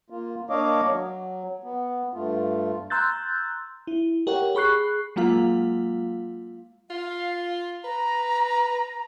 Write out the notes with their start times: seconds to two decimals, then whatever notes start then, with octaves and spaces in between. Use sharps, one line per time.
0.10 A#3 F4
0.50 A#3 D4 C#5 D#5 F5 D6
0.90 F#3
1.64 B3
2.14 G2 A3 F4
2.90 A#5 C6 E6 F#6 G6 A6
3.87 E4
4.27 G4 A#4 C#5 F#5
4.55 G#4 B5 C#6 F#6 C7
5.16 F#3 G#3 A#3 F4 F5
6.90 F4 F5
7.84 B4 A#5